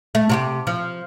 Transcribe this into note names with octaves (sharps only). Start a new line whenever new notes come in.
A3
C3 F#4 G4
F3